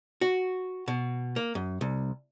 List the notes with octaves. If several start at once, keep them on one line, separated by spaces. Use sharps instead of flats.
F#4
B2
A#3
F#2
C2